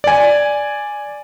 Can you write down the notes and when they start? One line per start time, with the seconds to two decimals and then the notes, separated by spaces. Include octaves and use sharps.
0.04 D5 G#5